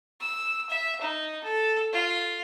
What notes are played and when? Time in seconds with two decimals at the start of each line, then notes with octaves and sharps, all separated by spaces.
0.21 E6
0.70 E5
1.02 D#4
1.44 A4
1.93 F4